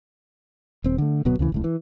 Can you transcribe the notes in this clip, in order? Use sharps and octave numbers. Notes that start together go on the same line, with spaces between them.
D#1 C4
D3 A3
D1 B2 F#3 B3
D2 C#3 E3
D1 C#2 A2
E3